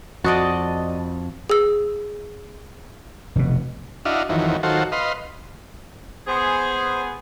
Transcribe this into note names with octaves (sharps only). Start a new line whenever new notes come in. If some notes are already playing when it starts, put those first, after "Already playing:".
F2 F#4 D5 D#5 A5
G#4 E6
F1 B2
D4 E4 F#4 D#5 F5
F2 D#3 E3 F#3
D#3 F#3 F4 F#4 A4 C5
B4 D#5 F5 C6
B3 G#4 C5